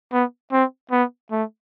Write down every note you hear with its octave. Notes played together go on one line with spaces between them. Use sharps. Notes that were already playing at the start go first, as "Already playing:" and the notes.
B3
C4
B3
A3